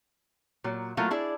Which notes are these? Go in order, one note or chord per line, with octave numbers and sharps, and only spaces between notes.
A#2 F#3
F#3 A3 A#3 E4 F4
D4 E4 G#4 D5